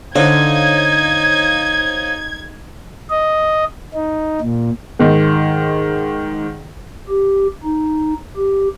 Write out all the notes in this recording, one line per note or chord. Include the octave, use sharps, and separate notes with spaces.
D3 D#4 C5 C#5 F5 G#6
D#5
D#4
A#2
G#2 D#3
G4
D#4
G4